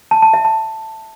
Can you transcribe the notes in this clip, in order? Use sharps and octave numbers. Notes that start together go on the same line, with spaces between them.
A5
A5
E5
A5